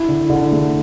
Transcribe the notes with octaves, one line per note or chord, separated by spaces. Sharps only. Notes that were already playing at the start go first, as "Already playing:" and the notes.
Already playing: E4
D3
D3
A3